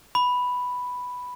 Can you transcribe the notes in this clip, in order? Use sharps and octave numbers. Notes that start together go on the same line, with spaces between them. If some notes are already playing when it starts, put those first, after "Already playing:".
B5